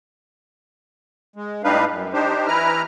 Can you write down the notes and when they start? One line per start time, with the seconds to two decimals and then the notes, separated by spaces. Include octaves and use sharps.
1.36 G#3
1.64 A2 G3 D4 D#4 B4 F5
1.91 F#2
2.13 D4 D#4 G4 C5
2.47 E3 E4 B4 A#5 F6